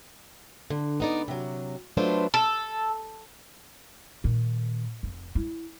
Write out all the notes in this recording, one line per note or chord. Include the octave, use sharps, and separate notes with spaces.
D3
B3 D#4 D5
C3 F#3
F#3 A3 D4 F4 B4 C5
A4
A#2 D#3
F1
E4